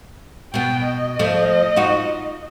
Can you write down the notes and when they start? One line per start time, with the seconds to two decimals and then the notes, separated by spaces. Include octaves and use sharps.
0.54 B2 B3 G5
0.84 D#5
1.19 F3 A3
1.76 D#4 F4 F#4